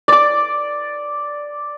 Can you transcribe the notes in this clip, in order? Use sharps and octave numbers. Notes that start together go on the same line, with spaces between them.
D5 D6